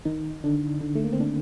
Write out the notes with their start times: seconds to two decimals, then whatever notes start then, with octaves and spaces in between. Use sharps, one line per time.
0.05 D#3 D#4
0.44 D3 D4
0.81 D3 D4
0.95 A3
1.04 A#3
1.13 C4
1.20 D3 D4